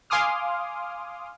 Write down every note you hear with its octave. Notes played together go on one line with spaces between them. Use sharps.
F5 G#5 C6 D6 D#6 F6